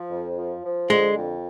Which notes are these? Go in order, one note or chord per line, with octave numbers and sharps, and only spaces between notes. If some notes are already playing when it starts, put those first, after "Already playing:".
Already playing: F3
F2
F3
F3
D3 G#3
F2